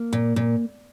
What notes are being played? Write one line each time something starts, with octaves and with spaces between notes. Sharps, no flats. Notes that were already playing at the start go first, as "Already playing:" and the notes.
Already playing: A#3
A#2
A#2